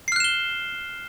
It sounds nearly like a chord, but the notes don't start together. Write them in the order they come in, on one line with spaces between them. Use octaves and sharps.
C7 F6 F#6 E7 G7